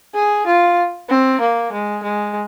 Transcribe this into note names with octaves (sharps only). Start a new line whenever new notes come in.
G#4
F4
C4
A#3
G#3
G#3